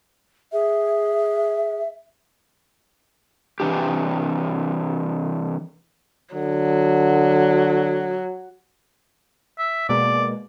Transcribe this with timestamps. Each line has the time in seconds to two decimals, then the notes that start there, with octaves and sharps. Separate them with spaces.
0.52 G#4 E5
3.60 C3 E3 D4 G4
6.34 D3 F#3
9.58 E5
9.89 B2 G#3 A#3 D5